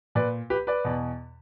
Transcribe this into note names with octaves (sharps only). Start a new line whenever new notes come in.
A#2 B4 D5
G4 B4
B4 D5
E2 B2